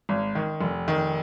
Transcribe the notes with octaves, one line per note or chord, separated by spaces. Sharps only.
G#1
D#3
F1
D#3